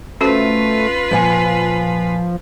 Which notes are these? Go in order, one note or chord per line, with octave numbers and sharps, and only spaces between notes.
A3 C#4 F4 F#4 B4 C5
A#2 F3 F#5 G#5